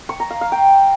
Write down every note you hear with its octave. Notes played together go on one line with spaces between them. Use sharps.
C#6
A#5
F5
F5
G5